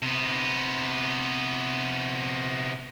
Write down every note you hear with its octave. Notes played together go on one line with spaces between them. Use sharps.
C3 B3